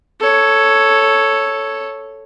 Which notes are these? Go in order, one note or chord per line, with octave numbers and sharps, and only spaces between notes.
A4 C#5